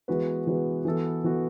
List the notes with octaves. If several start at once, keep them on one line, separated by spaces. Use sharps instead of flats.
E3 G#3 B3 F#4 B4
E3 G#3 B3 F#4 B4
E3 B3 F#4 A4
E3 B3 F#4 A4